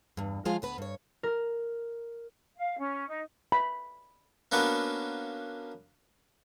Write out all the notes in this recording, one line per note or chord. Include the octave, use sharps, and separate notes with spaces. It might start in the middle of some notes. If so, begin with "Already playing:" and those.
E2 G2
F3 G#3 F4 G#4 F5
D2 B3 B4
G2 C#5
A#4
F5
C#4
D#4
B5
A#3 B3 C#4 D4 F#4 B4